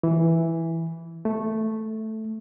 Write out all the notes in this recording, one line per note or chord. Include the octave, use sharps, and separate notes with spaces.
E3
A3